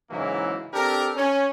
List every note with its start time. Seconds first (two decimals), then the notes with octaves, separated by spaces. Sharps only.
0.11 G#2 C#3 E3 F#3 A#3 E4
0.74 C4 D4 G4 A4 A#4
1.17 C#4